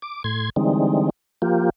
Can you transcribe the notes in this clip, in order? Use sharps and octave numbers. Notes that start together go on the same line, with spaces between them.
D6
A2 C6 G#6
D3 E3 G3 G#3 C4 D#4
F3 A#3 F4 G4